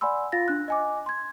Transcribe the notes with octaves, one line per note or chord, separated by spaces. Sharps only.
D5 F#5 G#5 B5 C6 E6
F4 F5 A6 A#6
D4 F#6
D#5 G#5 D6
C6 G#6